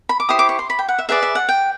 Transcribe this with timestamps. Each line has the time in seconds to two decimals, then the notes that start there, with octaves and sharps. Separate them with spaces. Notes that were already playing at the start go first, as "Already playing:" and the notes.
0.09 B5
0.20 D6
0.29 E4 G4 C5 D#6
0.39 D6
0.49 C#6
0.59 C6
0.70 B5
0.79 G5
0.88 F#5
0.99 E5
1.09 G#4 B4 D5 E5
1.22 E5
1.35 F#5
1.49 G5